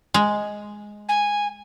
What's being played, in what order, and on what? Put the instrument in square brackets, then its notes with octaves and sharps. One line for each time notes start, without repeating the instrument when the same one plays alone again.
[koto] G#3
[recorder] G#5